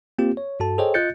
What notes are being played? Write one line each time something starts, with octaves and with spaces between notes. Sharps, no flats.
A#3 C4 F4 G4
C#5
G2 F#4 A4 A5
G#4 A4 C5 C#5 D#5 G5
F4 D#5 F#6 G6 A6 C#7